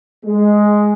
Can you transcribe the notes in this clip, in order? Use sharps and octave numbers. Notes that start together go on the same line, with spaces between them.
G#3